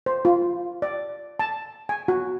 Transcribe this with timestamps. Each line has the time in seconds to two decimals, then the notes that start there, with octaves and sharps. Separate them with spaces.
0.06 C5
0.25 F4
0.82 D5
1.39 A5
1.89 G#5
2.08 F#4